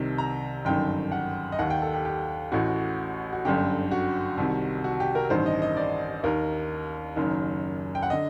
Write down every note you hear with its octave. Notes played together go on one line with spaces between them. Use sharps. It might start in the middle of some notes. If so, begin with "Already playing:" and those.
Already playing: C2 C3 D#3
A#5
G1 F#2 D#3 G5
F#5
D#5
D#2 D#3 F#5
G5
A4
G4
G4
A1 A2 F#4
F#4
G1 F#2 D3 G4
F#4
C2 C3 D#3
F#4
G4
A#4
A1 G2 D#3 C5
D#5
D#5
D5
D#2 D#3 A#4
F#1 F#2 D#3
G5
F#5
D3 D#5